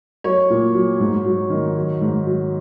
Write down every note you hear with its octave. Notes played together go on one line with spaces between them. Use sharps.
F#3 C#5
A#2
F#3
G#2
F#3
D#3
F#3
G#2
F#3